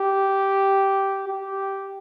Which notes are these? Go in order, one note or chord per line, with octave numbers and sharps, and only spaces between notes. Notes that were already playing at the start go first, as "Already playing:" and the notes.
Already playing: G4
G4